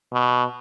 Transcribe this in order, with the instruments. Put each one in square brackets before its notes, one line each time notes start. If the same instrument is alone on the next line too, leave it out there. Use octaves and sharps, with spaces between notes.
[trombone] B2